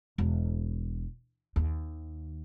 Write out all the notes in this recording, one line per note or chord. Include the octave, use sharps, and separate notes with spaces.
E1
D#2